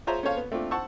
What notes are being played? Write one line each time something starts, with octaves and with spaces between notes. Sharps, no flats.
F4 G#4 C5 C#5 E5 A#5
C#4 A4 C5 C#5 F5
B3
A3 C4 D4 F4
C5 F#5 A5 C#6 E6